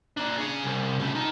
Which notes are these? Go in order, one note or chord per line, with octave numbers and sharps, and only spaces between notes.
A#3 D4
G#4 C#5
C2
C#3 A3
D#3 D#4